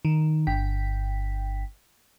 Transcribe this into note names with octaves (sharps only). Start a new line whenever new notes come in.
D#3
G1 G5 B6